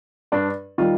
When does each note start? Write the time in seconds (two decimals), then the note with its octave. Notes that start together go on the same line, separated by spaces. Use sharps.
0.32 G2 D4
0.78 D#3 G3 F4